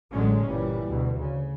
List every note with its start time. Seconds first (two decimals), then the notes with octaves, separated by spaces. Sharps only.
0.12 A1 D3 F#3 G#3 C#4
0.46 G1 A#2 E3 G3
0.88 D2 B2
1.20 C#3